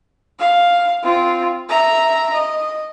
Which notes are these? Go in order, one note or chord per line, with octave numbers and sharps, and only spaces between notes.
F5
C4 F4
E5 A#5
D#5